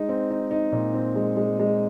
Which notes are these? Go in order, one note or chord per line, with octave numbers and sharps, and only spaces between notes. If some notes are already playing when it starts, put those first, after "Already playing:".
Already playing: G#3 D#4
C4
D#4
D#4
A#2
C4
G#3
G#3
G#3